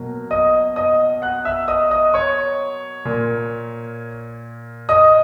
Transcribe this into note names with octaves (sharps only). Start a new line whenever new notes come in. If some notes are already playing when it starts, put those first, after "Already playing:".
Already playing: B2 F#3 A#3
D#5 D#6
D#5 D#6
F#5 F#6
E5 E6
D#5 D#6
D#5 D#6
C#5 C#6
A#2 A#3
D#5 D#6